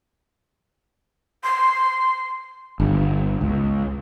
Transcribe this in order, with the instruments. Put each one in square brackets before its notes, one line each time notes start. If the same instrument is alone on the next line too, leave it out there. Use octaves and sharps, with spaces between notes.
[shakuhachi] C6
[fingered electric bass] G1
C#2